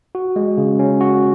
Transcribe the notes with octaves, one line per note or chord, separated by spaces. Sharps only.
F#4
G#3
C#3
C#4
F#4